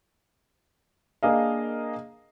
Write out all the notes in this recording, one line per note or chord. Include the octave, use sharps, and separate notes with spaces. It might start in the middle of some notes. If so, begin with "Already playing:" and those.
A#3 D4 G#4 A#4 D#5 F5